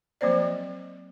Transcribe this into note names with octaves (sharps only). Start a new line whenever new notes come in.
F3 F#3 A#3 C4 C5 D5